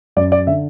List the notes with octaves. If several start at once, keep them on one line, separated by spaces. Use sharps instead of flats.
F#2 D5
D5
D3 E5